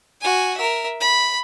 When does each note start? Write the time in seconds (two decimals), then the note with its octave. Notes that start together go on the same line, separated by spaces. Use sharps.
0.21 F#4 G#5
0.57 A#4 E5
1.00 B5